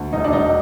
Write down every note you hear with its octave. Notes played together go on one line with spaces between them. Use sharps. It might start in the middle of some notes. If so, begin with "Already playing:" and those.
Already playing: D2
E1 D#4
D4
E1 D#4